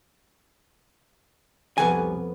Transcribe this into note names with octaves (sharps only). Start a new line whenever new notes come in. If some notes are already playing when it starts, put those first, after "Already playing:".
C2 F2 B3 G#5